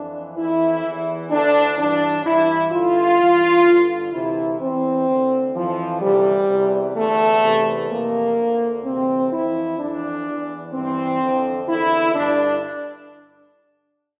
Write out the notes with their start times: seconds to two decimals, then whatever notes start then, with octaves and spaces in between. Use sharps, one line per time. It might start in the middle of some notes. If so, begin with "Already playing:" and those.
Already playing: F2 E3 D4
0.36 F2 E3 E4
0.84 E2 E3
1.31 D2 D3 D4
1.78 G2 E3 D4
2.25 G2 E3 E4
2.72 G2 D3 F4
3.20 G2 E3
3.66 G2 D3
4.13 D2 C3 E3 E4
4.60 E2 E3 C4
5.07 D2 D3
5.55 F2 E3 F3
6.02 D2 C3 E3 G3
6.48 E2 C3 E3
6.96 E2 D3 A3
7.43 E2 C3 E3
7.90 F2 C3 E3 A#3
8.37 D2 D3
8.84 D2 C3 E3 C4
9.32 F2 E3 E4
9.79 F2 E3 D4
10.26 E2 E3
10.73 G2 E3 C4
11.20 F2 D3
11.67 E2 D3 E4
12.15 G2 D3 D4